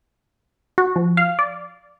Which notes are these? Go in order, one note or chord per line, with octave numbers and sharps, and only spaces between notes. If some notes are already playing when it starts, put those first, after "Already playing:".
F#4
F3
F5
D5